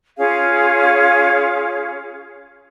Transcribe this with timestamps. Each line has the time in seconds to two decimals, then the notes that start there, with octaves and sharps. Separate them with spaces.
0.17 C#4 F4 G#4 F5